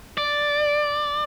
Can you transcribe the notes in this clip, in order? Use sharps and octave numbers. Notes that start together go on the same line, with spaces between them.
D5